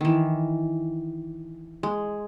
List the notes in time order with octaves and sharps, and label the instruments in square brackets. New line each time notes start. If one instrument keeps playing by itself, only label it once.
[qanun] D#3 E3
G#3